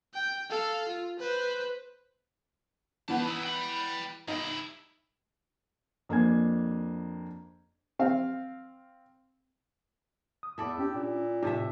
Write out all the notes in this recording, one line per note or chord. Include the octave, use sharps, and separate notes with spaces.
G5
A4 F5
F4
B4 C5
E3 G3 B3 A5
D#4 E4
G5 B5
G2 D#4 E4
F2 A#3 D4 C5 G#5 G#6
C4 F5
D#6
E2 E4 A4 D5
C#4 D4 G4
A#2
A2 C3 A3 D#4 E5